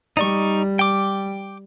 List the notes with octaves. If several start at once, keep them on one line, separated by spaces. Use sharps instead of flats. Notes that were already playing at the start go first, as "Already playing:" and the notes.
G3 D#4 D5 C#6
G5 D6